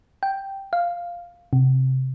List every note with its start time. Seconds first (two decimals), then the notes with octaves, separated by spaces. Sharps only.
0.23 G5
0.73 F5
1.53 C3